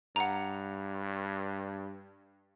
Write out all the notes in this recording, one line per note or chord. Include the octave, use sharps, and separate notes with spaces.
G2 F#5 A#5